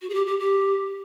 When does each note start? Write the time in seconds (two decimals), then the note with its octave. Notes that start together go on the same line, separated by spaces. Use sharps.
0.02 F#4
0.10 G#4
0.14 G4
0.27 G4
0.40 G4